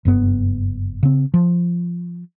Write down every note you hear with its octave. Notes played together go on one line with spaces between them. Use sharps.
F#1 G2 B3
C#3 C4
F3